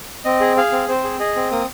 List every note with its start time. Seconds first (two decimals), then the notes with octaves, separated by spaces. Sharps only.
0.25 C4 D#5
0.41 G#4
0.57 G#4 F5
0.72 C4
0.88 C4 C5
1.04 G#4
1.19 G#4 D#5
1.36 C4
1.51 A#3 D#6